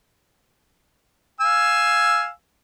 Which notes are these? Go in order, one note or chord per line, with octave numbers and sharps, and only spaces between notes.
F5 G#5 E6